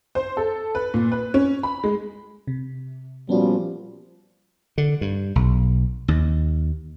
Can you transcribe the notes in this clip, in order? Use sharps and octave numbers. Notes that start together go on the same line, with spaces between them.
C5
A4
B4
A#2
B4
C#4
B5
G#3
C3
A#2 F3 G3 B3 C#4 F#4
D3
G2
B1
D#2